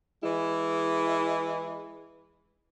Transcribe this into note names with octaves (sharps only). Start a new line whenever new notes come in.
E3 G#3 E4